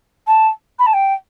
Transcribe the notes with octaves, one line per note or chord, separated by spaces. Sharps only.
A5
B5
A5
G5